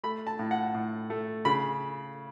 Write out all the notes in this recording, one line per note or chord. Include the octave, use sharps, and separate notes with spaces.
A3 B5
A5
A2
F#5
A2
A3
C#3 B5